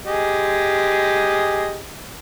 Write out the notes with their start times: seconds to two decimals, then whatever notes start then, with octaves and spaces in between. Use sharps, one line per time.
0.05 G4 G#4 D#5